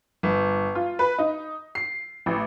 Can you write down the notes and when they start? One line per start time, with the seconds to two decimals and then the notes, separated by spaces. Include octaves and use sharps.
0.23 G1
0.75 F4
0.99 B4
1.18 D#4
1.75 C7
2.26 A1